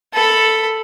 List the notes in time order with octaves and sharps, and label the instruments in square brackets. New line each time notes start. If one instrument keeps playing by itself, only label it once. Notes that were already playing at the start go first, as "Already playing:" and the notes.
[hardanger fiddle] A4 B5